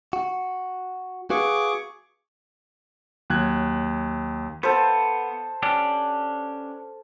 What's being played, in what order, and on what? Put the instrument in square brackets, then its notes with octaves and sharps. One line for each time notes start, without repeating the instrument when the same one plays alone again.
[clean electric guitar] F#4
[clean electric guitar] F#4 B4 F5 [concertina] G#4 C#6 D6
[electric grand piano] D#2 F#3 F#6 G#6
[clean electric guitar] B3 [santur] A4 C5
[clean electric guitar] C#4 D4 G4